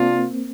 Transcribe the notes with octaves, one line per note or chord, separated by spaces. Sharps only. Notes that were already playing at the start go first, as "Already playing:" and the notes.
Already playing: C3 A#3 C4 D4 F4